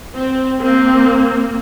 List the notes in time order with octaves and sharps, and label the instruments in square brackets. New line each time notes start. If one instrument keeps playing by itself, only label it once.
[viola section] C4
[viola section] A#3 [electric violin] C4